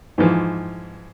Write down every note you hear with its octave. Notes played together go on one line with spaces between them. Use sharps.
G#2 E3 F3